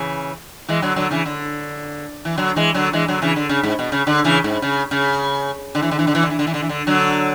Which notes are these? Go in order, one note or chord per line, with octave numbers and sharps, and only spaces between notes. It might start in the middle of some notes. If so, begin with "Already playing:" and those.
Already playing: C#3 E3
E3 G#3
D3 F#3
D3 F#3
C#3 E3
D3
E3
D3 F#3
E3 G#3
D3 F#3
E3 G#3
D3 F#3
C#3 E3
D3
C#3
G#2
B2
C#3
D3
C#3 E3
G#2
C#3
C#3
D3
E3
D3
E3
D3
E3
D3
E3
D3
E3
D3
E3
D3
D3 F#3